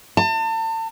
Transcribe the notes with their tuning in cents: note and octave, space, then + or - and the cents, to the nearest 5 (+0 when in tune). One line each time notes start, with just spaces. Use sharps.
A5 +35